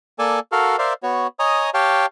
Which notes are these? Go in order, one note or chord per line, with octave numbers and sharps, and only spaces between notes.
A#3 A4 D5 G#5 A5
F#4 A4 A#4 F5
A#4 C5 D5 E5 F5
B3 F#4 C#5
C#5 D#5 G#5 A#5 D#6
G4 C#5 F5 G5 A5